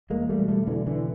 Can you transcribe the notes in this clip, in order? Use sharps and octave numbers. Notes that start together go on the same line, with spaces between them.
E2 G#3 A#3
G3 A3
B2
G3 A3
B2 D3 E3
D3 E3